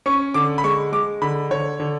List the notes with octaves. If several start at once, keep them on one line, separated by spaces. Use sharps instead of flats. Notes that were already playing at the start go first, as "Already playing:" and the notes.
C#4 C#6
D3 D6
B5
G#3 C#6
G#3 D6
D3 B5
D3 C#5
D3